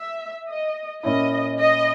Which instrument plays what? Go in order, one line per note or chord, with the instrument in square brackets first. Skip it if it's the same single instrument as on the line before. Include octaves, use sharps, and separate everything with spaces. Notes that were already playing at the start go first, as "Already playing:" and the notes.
Already playing: [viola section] E5
D#5
[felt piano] A#2 A#3 C#4 E4 [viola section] D#5
[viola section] D#5